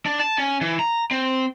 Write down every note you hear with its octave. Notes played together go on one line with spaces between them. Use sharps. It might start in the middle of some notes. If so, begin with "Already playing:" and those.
D4
A5
C#4
E3
A#5
C4